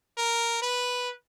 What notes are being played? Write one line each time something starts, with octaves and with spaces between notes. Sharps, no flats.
A#4
B4